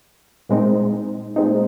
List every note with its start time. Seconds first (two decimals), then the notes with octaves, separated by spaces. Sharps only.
0.49 A#2 G#3 C4 D#4
1.36 A#2 G#3 C4 D#4